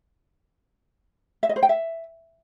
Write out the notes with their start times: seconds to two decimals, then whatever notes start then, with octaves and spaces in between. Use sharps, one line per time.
1.43 E5
1.49 D#5
1.56 C5
1.63 G5
1.69 E5